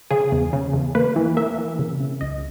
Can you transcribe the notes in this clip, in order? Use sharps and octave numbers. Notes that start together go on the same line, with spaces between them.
C#3 G#4
E2
C#3
E2
A#3 B4
E3
A#3 E5
E3
C#3
C#3
C#2 D#5